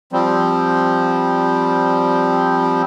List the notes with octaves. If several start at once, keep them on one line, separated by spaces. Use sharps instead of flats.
F3 G3 C4